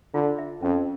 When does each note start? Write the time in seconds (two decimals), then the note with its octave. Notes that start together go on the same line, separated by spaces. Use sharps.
0.14 D3 F4
0.38 E5
0.62 F2 C#4